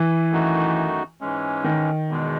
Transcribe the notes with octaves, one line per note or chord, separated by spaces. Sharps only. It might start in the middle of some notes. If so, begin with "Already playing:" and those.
Already playing: E3
F#2 D#3 A3 D#4 F#4
G#2 E3 G#3 C#4
D#3
E2 B2 G#3